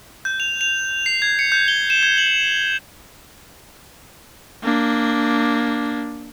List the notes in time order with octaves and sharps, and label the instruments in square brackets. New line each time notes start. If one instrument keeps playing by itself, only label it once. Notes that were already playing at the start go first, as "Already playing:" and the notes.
[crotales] G6
F7
F7
C7
G#6
C#7
G6
G7
E7
G#6
F#7
[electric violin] A#3 D4